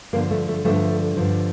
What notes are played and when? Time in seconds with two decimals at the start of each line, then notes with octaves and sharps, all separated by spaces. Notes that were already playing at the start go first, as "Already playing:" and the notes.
0.13 G2 D3 F3 A#3
0.31 A3
0.48 A3
0.64 G2 D3 F3 A3
1.16 G2 D3 F3